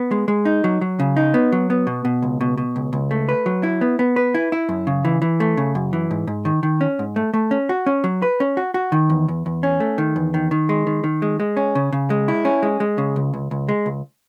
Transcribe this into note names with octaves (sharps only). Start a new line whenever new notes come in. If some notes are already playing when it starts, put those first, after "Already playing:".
Already playing: B3
G#3
G#3
D#4
F#3
F#3
C#3
D#4
B3
F#3
B3
B2
B2
C#2
B2
B2
C#2
C#2
A3
B4
F#3
E4
B3
B3
B4
E4
E4
F#2
C#3
E3
E3
A3
C#3
F#2
E3
G#2
G#2
D#3
D#3
C#4
G#2
A3
A3
C#4
F#4
C#4
F#3
B4
C#4
F#4
F#4
D#3
E2
E2
E2
C#4
A3
D#3
E2
D#3
D#3
G#3
D#3
D#3
G#3
G#3
C#4
C#3
C#3
G#3
E4
C#4
G#3
G#3
C#3
C#2
C#2
C#2
G#3
C#2